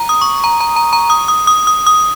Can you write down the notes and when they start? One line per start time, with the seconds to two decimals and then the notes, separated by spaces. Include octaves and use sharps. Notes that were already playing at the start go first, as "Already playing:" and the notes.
Already playing: A#5
0.09 D#6
0.21 C#6
0.44 A#5
0.60 A#5
0.76 A#5
0.93 A#5
1.10 D#6
1.28 D#6
1.47 D#6
1.67 D#6
1.87 D#6